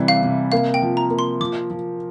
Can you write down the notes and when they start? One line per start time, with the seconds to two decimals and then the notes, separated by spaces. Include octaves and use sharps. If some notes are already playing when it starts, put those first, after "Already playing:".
Already playing: C3 E3 G3
0.08 F5
0.23 C3
0.52 A#3 F5
0.74 G5
0.82 F3
0.97 A#5
1.10 A#3
1.19 C6
1.40 F3 D6
1.70 F3